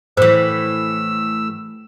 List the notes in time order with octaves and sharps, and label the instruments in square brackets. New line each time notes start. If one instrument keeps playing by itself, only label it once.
[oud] A2 E3 [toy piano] C5 [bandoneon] E6